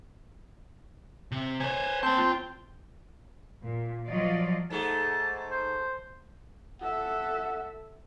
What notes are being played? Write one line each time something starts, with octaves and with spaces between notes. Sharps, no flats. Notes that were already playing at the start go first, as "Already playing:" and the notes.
C3
C5 C#5 G#5
A#3 C4 G5 A5
F4
A#2
F3 F#3 F4 D5 D#5
G#2 A3 G#4 A5
C5
A4 E5 F#5